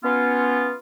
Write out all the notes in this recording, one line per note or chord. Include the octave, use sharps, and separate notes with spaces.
B3 C#4 F4